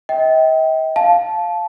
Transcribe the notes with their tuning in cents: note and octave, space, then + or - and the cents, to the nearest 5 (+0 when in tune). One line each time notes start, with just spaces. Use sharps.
D#5 +45 G5 -10
F5 +0 A5 -15